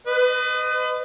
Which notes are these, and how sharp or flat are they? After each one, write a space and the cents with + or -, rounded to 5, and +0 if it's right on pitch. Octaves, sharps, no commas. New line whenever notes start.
B4 +35 D#5 -15